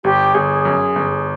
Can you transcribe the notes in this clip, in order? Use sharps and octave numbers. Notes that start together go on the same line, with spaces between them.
G1 G4
G1 G#4
F#2
G1